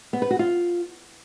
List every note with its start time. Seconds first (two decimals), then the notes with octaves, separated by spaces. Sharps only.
0.13 B3
0.22 B4
0.31 F#4
0.39 F4